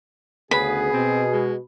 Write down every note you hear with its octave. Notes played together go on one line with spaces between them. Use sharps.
D2 C#3 B3 G#4 B4 B5
B2 C4
G#3